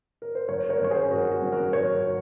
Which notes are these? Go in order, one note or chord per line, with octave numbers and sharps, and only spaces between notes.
A#4
C5
F#1 A#4 C#5
A#4 C#5
F#2 D#3 A#3 C#4 C#5
G#4 C5
F#1 F#4 A#4
F#4
F#2 D#3 A#3 C#4
F#4 A#4
F#1 A#4 C#5
D#3